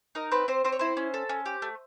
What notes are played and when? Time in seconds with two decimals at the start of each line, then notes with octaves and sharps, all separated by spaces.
0.15 D#4 A#4
0.31 C4 B4
0.48 C4 C5
0.64 C4 C5
0.72 C#5
0.79 E4 C5
0.97 C#4
1.14 A4
1.29 C#4
1.46 G4
1.62 A3